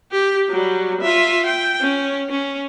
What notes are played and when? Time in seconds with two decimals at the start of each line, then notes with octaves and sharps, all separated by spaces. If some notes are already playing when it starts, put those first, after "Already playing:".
0.11 G4
0.50 F#3 G3
1.01 F4 E5
1.46 G5
1.80 C#4
2.30 C#4